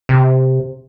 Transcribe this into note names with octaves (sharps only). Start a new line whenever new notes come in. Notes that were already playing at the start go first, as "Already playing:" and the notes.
C3